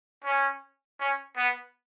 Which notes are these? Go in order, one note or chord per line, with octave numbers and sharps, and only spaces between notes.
C#4
C#4
B3